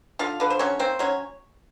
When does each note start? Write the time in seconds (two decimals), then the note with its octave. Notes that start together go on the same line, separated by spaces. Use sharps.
0.19 D3 F4 F5
0.40 D3 B4
0.50 C5
0.59 F#3 C#4 C#5
0.79 A#3 C4 C5
0.99 F#3 C#4 C#5